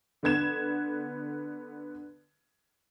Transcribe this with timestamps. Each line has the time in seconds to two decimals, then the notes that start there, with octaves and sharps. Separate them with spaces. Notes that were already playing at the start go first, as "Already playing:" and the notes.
0.23 D3 B3 G#6 E7